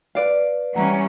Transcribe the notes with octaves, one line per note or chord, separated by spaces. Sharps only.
B4 D5 F5
E3 G3 C#4 F#5 A#5